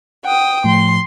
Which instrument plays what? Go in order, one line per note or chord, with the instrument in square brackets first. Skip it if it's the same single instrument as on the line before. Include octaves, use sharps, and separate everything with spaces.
[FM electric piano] F#5 [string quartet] G5 D#6
[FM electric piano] A2 F3 [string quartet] C6